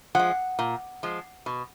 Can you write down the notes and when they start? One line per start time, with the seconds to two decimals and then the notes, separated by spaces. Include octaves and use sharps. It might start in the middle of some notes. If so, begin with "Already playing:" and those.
0.15 F3 G#3 F#5
0.59 A#2
1.03 F3 G#3
1.46 B2